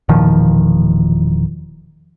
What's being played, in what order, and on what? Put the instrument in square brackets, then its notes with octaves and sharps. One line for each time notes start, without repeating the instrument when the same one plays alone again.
[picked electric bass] E1 A#2 D#3 F3